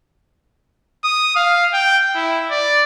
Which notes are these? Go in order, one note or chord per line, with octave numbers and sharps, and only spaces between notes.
D#6
F5
G5
E4
D5